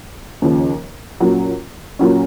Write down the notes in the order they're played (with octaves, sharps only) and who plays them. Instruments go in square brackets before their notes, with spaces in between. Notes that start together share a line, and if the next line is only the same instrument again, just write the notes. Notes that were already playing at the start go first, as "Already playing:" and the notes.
[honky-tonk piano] D#2 C#3 F3
A#2 F#3 C#4
A#2 F#3 C#4